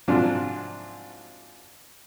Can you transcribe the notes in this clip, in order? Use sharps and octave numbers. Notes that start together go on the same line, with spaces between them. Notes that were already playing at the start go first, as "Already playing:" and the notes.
G#2 C3 F3 F#3 D4 F4